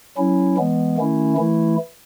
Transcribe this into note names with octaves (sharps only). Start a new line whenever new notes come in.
F#3 C#4 E4
E3 G#3 B3
D#3 A3 C#4 E4
E3 A3 E4